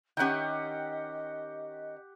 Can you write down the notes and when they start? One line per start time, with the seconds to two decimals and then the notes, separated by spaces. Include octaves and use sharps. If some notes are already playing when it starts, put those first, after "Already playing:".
0.17 D#3 C#4 G4 D#5 F#5 G5